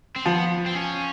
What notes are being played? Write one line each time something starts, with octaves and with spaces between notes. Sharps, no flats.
C4
F3 B3
C4
C#4